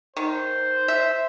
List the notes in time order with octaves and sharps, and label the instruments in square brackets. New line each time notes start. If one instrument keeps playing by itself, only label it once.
[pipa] D#3 [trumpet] C5
[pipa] E5